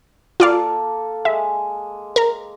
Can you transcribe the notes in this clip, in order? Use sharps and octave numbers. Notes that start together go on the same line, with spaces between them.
A#3 F4 A4 D5 F5
G#3 E5
A#4 A#5